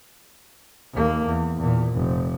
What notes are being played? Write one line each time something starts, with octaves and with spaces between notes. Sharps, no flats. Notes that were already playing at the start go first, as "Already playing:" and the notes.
D#2 A#3
E2
E2 A#2
F1